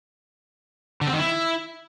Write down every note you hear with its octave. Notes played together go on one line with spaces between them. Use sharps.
D3
C4
D#3
E4